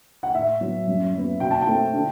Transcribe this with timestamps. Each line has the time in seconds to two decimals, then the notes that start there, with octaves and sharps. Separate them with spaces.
0.23 F#5
0.34 A2 E5
0.61 F#3 B3 E4
0.88 F#2
1.14 F#3 B3
1.40 B2 G5
1.51 A5
1.61 G5
1.67 A3 C4 E4
1.94 D3